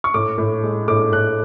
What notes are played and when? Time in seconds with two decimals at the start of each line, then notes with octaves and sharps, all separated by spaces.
0.04 C#6
0.14 A2 D6
0.38 A2
0.63 G#3
0.88 A2 D6
1.12 A2 F#6